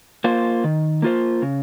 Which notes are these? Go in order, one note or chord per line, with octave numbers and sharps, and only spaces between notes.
A#3 F4 C5
D#3
A#3 F4 C5
C#3